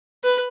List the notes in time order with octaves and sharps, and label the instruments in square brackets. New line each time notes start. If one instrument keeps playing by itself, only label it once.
[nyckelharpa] B4